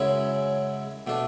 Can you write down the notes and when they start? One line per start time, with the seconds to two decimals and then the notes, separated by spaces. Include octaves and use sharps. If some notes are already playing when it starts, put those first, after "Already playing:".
Already playing: F#2 C#3 G#3 C#4 E4
1.07 B2 A3 D4